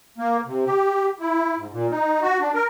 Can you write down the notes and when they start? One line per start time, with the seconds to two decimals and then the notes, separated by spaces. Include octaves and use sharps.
0.18 A#3
0.46 C3
0.66 G4
1.20 E4
1.57 G#2
1.72 A#2
1.91 D#4
2.22 F#4
2.40 D4
2.54 A#4